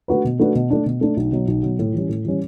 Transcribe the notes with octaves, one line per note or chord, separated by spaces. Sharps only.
A3 D4 F#4 B4
B2
A3 D4 F#4 B4
B2
A3 D4
B2
A3 D4
B1
B2 F#3
B1
B2 F#3
A2
E3 G3 C#4
A2
E3 G3 C#4